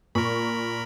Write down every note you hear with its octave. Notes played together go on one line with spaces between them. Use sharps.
A#2 A#4 B5 C#6